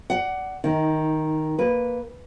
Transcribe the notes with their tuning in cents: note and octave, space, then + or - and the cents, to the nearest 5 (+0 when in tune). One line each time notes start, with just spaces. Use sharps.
D5 +0 F#5 +20
D#3 +0 D#4 +25
A#3 +0 B4 +0